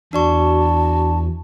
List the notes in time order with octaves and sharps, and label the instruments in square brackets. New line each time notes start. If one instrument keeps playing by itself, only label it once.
[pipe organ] E2 [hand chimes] D4 D5 C#6 [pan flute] F#4 [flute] A5